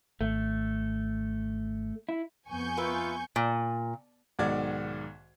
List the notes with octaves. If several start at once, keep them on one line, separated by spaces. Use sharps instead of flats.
G#1 A3
E4
F2 B3 G#5 C#6 G6
F4 A#4 B4 E5
A#2
B1 G#2 D#3 F#4 D5 G#6